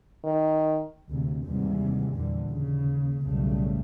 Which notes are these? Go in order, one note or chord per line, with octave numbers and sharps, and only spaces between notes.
D#3
D2 G#2 C3
D#2 G#2 C3 E3 G3
E2 A#2 D3 E3 G3
D#2 C#3
B1 E2 A2 C#3 G3 A3